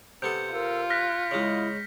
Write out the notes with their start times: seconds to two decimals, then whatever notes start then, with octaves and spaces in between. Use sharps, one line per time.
0.22 C3 B3 A4 G6 C#7
0.53 F4 A#4 E6
0.90 F6 F#6 A#6 B6
1.31 C#3 G#3 E4 D#5